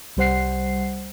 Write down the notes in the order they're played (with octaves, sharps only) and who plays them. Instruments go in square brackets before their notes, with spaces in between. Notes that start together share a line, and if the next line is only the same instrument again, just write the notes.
[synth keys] C2 G3 C5 F#5 C7